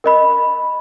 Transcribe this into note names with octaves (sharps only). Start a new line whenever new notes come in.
A#4 D#5 B5